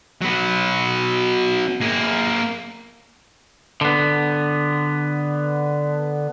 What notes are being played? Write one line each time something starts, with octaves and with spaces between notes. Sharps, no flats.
F#3 B3
A#3 G#4
D3 B3